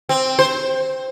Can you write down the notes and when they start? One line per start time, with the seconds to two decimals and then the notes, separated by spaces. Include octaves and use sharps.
0.09 C4
0.39 C5